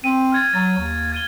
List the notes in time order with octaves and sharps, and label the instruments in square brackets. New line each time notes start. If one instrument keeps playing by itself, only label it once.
[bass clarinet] C4 [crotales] D#7
[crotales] F6 G#6 A6
[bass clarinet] F#3 [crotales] A6
[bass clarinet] D#2
[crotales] G#6 D#7 G7